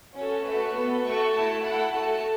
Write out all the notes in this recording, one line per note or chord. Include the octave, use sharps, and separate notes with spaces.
C#4 F#4 A4
A3 F#4 A4 B4
B3 A4
A3 F#4 A4 C#6
A3 E4 A4 A5
A3 E4 A4 F#5
A3 F#4 A4 A5